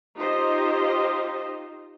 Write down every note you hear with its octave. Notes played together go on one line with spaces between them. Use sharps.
D#4 F4 G4 C5 D#5